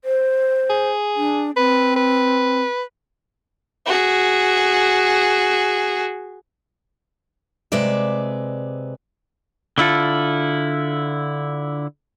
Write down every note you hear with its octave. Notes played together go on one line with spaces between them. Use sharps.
C5
G#4
D4
C4 B4
B4
F#4 G#4
C3 G#3 B4 D5 E5
D3 E4 F4 A4